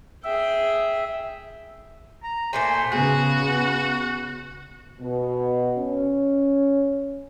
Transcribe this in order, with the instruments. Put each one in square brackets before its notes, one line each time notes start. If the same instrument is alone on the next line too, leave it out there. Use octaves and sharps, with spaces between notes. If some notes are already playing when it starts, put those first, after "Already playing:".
[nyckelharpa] G#4 G5 [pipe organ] E5
[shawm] A#5
[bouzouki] A#2 A3 G#5 [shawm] C5
[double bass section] C#3 B3 [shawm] F#4 [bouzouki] G#4
[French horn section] B2
C#4